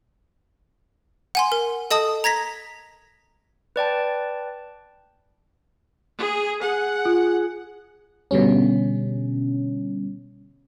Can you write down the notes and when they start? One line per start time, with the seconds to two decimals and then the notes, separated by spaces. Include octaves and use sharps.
1.35 F#5 G#5 C6
1.52 A#4
1.91 A4 D#5 A5 D#6
2.24 A#5 G#6 A#6 B6
3.76 B4 D5 G5 A5
6.21 G#4
6.63 G#4 F#5
7.05 F4
8.31 B2 D3 G3 C#4